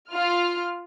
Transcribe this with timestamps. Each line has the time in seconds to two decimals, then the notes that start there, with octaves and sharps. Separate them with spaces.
0.11 F4 F6